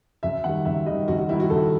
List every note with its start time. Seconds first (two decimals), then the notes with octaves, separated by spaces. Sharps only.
0.23 F#2 E5
0.44 D#3 G3 F#5
0.65 F#2 E5
0.86 D#3 G3 D#5
1.08 F#2 F#4
1.19 F#4
1.29 D#3 G3 E4
1.40 F#4
1.50 F#2 A4